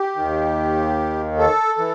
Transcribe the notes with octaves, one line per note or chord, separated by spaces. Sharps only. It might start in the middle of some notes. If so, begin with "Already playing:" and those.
Already playing: G4
D#2 D#3
A4
E3